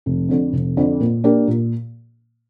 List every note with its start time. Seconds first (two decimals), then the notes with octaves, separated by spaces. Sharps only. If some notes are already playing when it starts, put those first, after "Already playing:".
0.06 F1
0.29 F2 D3
0.53 F1
0.77 F2 D3
1.00 A#2
1.24 A#3 D4 G4
1.48 A#2